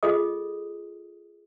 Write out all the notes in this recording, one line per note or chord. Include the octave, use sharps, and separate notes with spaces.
F4 G#4 A4 D#5 D#6